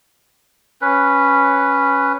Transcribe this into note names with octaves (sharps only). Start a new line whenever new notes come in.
C#4 B4